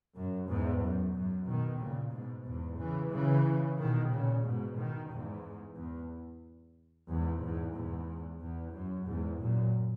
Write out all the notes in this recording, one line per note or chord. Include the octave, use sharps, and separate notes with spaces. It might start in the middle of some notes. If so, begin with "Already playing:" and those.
F#2
E2 G#2
F#2
F#2
B2 D#3
A#2 C#3
G#2 B2
E2 G#2
C#3 E3
C#3 E3
B2 D#3
A#2 C#3
G#2 B2
B2 D#3
E2 G#2
E2
E2 G#2
E2 G#2
E2 G#2
E2
F#2
E2 G#2
F#2 A#2